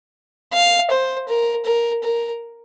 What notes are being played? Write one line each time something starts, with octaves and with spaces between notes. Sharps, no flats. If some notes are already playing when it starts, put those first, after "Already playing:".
F5
C5
A#4
A#4
A#4